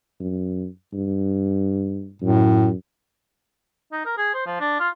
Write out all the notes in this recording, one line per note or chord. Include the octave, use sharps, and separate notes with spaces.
F#2
G2
F#2 A2
D#4
A#4
G#4
C5
F3
D4
F4